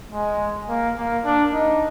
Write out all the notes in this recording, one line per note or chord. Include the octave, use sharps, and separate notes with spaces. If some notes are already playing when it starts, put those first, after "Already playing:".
G#3
A#3
A#3
D4
D#4